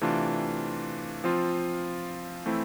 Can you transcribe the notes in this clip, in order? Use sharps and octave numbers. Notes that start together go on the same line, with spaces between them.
C3 E3 A3 D4 F4
F3 C4 F4
E3 A3 C4 E4